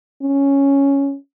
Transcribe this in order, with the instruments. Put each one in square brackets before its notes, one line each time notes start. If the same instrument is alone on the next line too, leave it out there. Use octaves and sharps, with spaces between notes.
[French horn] C#4